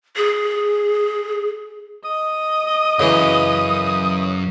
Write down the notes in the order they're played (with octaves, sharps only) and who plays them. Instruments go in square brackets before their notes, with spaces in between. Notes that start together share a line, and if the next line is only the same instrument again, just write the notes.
[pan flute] G#4
[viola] D#5 [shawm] D#6
[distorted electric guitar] F#2 [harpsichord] C#3 E3